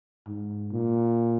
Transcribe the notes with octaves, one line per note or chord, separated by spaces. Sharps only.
G#2
A#2